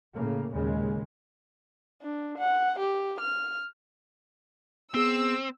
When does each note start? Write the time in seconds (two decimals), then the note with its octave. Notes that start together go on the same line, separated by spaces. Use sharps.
0.14 A2 C#3 A#3
0.51 D#2 A#2 C#3 G#3
2.02 D4
2.38 F#5
2.80 G4
3.21 F6
4.95 B3 C4 G#4 E6